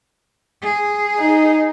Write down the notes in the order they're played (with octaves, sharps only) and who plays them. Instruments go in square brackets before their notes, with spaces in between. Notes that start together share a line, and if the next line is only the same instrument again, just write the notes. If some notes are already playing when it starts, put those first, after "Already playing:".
[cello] G#4
[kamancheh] D#4